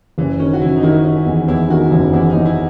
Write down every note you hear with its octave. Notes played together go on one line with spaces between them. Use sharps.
F#1 E3
D#3 C#4
F#4
F#1 E4
D#4
D#3 E4
D#3
E2
E2 E4
D#3 F#4
F#1 E4
E2 E4
E2 D#4
E4